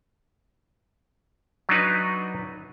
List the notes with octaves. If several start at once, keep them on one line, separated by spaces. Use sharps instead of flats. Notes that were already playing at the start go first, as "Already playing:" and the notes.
F#3 D4 D#4 B4